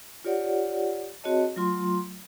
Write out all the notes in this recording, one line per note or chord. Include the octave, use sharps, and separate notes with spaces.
F4 G4 C#5 D5 F#5
C4 F#4 G#4 C#5 D#5 A5
F#3 A3 F4 C6